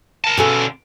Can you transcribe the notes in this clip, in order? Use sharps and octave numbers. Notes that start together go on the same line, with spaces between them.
A#4 A5
B2 D3 C#4 G#4 A4